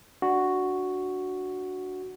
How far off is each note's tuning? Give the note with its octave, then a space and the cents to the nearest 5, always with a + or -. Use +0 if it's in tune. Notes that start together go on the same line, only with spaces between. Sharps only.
D4 +0 F#4 +0